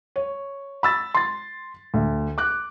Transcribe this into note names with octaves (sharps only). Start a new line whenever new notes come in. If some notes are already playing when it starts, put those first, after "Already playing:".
C#5
B5 E6 A6
C6 A6
D2
D6 F#6